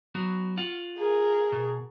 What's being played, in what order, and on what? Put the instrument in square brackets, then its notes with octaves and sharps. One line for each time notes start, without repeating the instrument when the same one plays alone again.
[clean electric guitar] F#3 B3 F#4
F4 F#5
[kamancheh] G#4 A#4
[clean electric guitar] B2